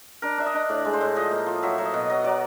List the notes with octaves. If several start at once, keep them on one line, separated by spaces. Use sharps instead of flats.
D4 A#4
D4 E5
D#5
D4
A2 D5
G#3
C5
A2
F3 D#5
A#3
F3
F#3 E5
F#3
D#5
B2
F#3 D#5
F#3 D5